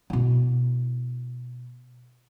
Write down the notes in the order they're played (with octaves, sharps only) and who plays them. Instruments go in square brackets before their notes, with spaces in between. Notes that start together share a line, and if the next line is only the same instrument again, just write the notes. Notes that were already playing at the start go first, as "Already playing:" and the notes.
[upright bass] B2 E4